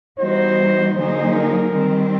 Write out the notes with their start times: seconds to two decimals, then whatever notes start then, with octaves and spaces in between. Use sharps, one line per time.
0.19 E3 G3 B3 D#4 F#4 C5
0.96 D3 F#3 A#3 D#4 G#4 C5
1.35 A#4
1.73 D#3 G3 C4